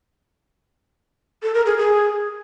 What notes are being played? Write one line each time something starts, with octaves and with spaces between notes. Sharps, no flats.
A4
A#4
G#4
G#4